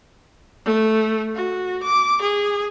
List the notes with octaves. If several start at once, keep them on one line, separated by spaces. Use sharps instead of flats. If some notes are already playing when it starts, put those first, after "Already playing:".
A3
F#4
D6
G#4